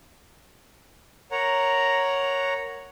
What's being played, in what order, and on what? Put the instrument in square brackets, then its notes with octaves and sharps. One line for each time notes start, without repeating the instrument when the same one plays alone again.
[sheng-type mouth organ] A#4 C#5 F#5 A#5